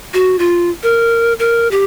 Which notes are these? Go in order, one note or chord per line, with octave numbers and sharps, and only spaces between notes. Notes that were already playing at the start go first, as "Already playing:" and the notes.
F#4
F4
A#4
A#4
G4